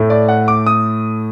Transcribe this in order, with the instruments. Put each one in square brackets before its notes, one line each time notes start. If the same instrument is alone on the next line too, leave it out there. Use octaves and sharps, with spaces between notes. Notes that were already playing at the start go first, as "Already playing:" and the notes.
Already playing: [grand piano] A2 A3
D5
F#5
D6
D#6